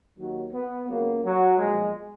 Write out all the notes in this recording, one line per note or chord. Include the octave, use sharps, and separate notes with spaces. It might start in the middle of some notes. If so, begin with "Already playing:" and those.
D#2 D#3 F#3
B3
C#2 C#3 F#3 A#3
F#3
B1 A#2 F3 G#3